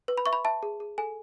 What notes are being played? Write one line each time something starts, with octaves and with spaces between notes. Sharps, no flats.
B4
B5
E5 C#6
B5
E5 A5
G#4
G#4
A4 G#5